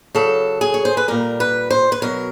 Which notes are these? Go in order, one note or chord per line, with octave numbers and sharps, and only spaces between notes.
C#3 F#3 A4
G#4
C#5
C5
B4
A#2 G3 A#4
B4
C5
B4
B2 F#3 A#4